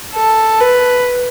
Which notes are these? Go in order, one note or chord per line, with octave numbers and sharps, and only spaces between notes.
A4
B4